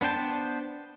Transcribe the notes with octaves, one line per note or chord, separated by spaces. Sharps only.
B3 D4 C5 G5 A5